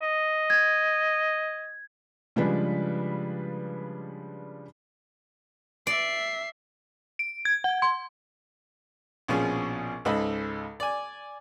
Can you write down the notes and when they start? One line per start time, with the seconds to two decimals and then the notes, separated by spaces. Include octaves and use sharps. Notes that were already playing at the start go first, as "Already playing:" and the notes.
0.02 D#5
0.50 G#6
2.36 C#3 F3 G3 G#3 D4 B4
5.87 D5 E5 C7
7.19 D7
7.45 G#6
7.64 F#5
7.82 C6
9.28 A#1 B2 F3 C#4 G#4
10.05 C#2 G#2 A4 D#5 B5
10.80 D5 G#5